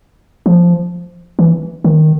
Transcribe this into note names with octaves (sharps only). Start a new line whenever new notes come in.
F3
E3
D#3